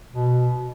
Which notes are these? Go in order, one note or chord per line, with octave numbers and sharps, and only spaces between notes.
B2